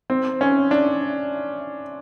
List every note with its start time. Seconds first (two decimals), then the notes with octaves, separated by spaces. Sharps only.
0.10 C4
0.41 C#4
0.71 D4